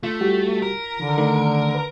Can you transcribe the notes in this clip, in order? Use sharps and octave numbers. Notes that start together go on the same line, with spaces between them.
A3 F4 B6
G3 F#4 G4
A#4
D3 D#3
D#3 A3 D5
B4